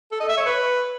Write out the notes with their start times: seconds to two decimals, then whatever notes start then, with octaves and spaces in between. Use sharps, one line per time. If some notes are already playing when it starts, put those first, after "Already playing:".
0.12 A4
0.21 D#5
0.29 E5
0.38 C#5
0.46 B4